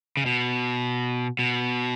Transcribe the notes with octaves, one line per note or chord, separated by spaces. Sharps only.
C#3
B2
B2